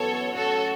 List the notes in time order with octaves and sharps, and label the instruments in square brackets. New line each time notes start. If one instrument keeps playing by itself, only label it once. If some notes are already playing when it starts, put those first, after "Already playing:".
Already playing: [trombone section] F#2 E3 B3 [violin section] A4 C#5
[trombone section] A2 F#3 C#4 [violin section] F#4 A4